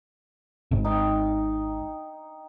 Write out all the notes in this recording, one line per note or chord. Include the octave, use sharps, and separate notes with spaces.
G#1 G#2
D#4 G5